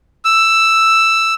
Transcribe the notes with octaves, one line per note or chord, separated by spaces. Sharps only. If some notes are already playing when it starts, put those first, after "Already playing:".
E6